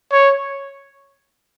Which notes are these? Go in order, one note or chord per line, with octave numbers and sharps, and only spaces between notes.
C#5